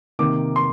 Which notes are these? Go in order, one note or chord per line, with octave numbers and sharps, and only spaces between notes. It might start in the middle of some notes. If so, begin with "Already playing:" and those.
C3 D#3 A#3 D6
C6